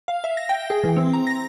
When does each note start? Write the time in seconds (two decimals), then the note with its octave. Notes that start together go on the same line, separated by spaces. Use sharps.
0.08 F5
0.24 E5
0.37 A#6
0.49 G5
0.70 G#4
0.84 E3
0.97 C4
1.13 A#5
1.27 A#6